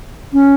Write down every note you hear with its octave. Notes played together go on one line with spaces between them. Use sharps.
C#4